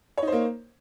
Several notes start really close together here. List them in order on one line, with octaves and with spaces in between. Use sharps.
C#5 D#4 C5 A#3